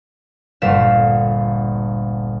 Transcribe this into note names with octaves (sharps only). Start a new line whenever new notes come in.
G1 D2 A#2 F5 B6 E7